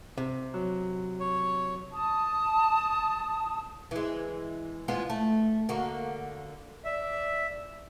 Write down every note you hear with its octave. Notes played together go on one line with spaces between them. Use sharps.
C3
F#3
C#5
A5 D#6
E3 G#3
G#3 B3 F4
A3
D3 A#3 F#4
D5 E5